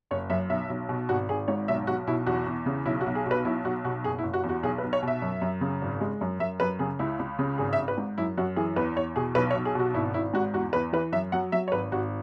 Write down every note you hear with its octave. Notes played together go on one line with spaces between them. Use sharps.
F#1 C#5
F#2 E5
B1 E5
B1
B2
G#1 F#4
G#1 G#4
G#2 C#5
B1 E5
B1 F#4
B2 E4
E2 F#4
E2
C#3
B1 E4
F#4
B1
G#4
B2 B4
B1 E4
B1 F#4
B2 F#4
F#1 G#4
E4
F#1
F#4
E2
F#4
B1 G#4
B4
B1
C#5
B2 E5
F#2
F#2
C#3
G#1
G#3
F#2
F#2 E5
F#2 B4
C#3 G#4
C#2 E4
C#2
C#3
G#1 G#4
E5
G#1
B4
G#2
F#2 E4
F#2 F#4
E3 G#4
E2 B4
E2 C#5
B2 G#4
B1 B4
C#5
B1
G#4
B2 F#4
G#1 E4
G#1 E4
G#2 F#4
E2 F#4
E2 B4
E3 B4
F#2 E5
F#3 F#5
F#3 E5
C#5
G#1 B4
G#1 F#4